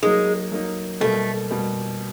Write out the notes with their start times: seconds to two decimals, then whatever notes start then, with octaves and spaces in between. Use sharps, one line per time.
0.03 F#3 G#3 A#3 D#4
0.52 F#3 A#3 D#4
1.01 B2 G3 A3 A#3
1.50 B2 G3 A#3